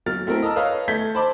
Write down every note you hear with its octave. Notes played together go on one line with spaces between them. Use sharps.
F#3 A#3 F6 A6
A3 C4 E4 A#4
D#5 A5 A#5 E6
A4 B4 C#5 D#5 F5
A3 G6 G#6 B6 G7
C5 A5 B5 D6